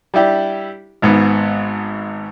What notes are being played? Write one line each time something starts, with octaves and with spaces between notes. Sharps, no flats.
G3 D4 E4 G4
G#1 G#2 B3